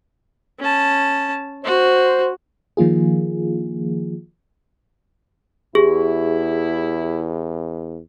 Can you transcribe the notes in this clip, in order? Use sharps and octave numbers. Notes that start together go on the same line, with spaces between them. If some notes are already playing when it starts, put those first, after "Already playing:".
C#4 A5
F#4 C5
D#3 F3 A#3 F4 G#4
E2 E4 G4 G#4